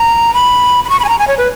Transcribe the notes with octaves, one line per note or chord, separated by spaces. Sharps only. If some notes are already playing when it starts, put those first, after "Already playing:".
Already playing: A#5
B5
B5
C#6
B5
G#5
A#5
G#5
C#5
B4